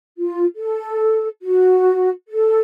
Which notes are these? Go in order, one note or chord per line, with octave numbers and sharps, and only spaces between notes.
F4
A4
F#4
A4